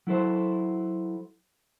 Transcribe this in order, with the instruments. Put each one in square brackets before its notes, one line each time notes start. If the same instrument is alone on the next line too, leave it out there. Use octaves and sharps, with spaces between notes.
[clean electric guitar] F#3 E4 A4 C5